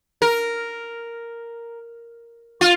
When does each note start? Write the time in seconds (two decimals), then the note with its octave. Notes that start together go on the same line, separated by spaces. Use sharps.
0.22 A#4
2.61 F4